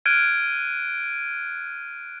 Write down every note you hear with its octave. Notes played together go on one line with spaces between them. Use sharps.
F6 F#6 G#6 D7 D#7